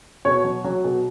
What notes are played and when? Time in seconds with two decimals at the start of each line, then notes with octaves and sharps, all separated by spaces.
0.25 B2 C#5
0.44 F#3
0.64 F#3
0.84 B2